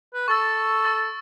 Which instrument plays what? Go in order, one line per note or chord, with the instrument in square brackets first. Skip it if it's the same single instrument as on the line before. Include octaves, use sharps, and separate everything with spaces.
[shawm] B4
[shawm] A4 [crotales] C#6 E6 A6
[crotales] C#6 E6 A6